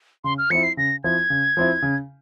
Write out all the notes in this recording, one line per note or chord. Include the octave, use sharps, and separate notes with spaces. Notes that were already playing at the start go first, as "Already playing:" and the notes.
C#3 C6
F6
F3 C4 E4 C#7
C7
C#3 A#6
F3 C4 E4 G#6
C#3
F3 C4 E4
C#3